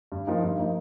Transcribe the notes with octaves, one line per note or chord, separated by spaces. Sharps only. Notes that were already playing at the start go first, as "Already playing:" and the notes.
G2
F3 A#3 D#4
G2
F3 A#3 D#4